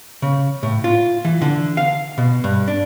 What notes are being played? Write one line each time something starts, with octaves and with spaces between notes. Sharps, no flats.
C#3
A2
F4
E3
D3
F5
B2
G2
D4